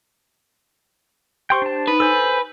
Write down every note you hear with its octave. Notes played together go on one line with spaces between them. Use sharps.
G4 C5 G5 C6 C#6
D4 A5
D#4 B4
A4 C5 G#5